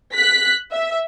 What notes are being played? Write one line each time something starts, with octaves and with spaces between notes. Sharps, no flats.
F#6 B6
E5